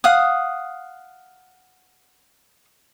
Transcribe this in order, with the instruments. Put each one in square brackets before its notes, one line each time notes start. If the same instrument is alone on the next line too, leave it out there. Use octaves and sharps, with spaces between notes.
[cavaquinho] F5 F#5 D#6